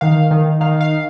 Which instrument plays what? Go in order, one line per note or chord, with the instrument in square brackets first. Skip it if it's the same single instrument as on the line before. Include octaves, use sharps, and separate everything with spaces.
[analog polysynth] D#3 F5
D#3
D#3 F5
F5